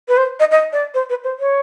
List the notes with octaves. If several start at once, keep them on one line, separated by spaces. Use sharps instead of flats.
B4
C5
D#5
D#5
D5
C5
B4
C5
C#5